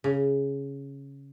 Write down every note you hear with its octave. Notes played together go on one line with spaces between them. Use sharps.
C#3